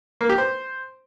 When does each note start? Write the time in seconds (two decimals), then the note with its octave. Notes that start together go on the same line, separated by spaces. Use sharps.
0.21 A#3
0.29 G4
0.38 C5